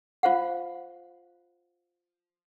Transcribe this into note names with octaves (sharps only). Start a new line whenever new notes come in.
F4 C5 F5 F#5